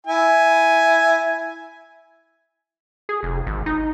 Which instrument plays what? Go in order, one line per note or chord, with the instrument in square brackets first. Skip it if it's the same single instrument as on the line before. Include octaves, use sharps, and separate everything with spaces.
[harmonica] E4 G#5
[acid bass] G#4
F1
G#1
D#4